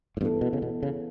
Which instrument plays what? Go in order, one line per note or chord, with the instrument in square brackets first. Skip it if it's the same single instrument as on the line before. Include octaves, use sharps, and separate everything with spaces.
[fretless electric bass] A2
[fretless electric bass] G2 [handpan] E3 B3 E4 A4
[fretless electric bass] B2
C#3
B2
C#3